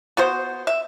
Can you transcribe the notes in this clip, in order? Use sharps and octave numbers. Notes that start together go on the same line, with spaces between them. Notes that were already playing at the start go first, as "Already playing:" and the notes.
B3 F#4 C5
E5